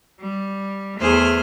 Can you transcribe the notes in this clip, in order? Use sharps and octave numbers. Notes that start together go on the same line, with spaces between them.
G3
E2 A3 G#4 C5 F6